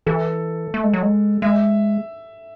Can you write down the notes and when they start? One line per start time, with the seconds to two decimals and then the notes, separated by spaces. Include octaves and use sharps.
0.06 E3 A4
0.74 A3
0.84 G#3
0.93 F#3
1.03 G#3
1.42 G#3 E5